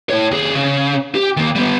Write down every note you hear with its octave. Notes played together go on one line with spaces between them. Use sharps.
E4 C#5
D#2 G#4
C#3
G4
D#3 A#3
G3 B3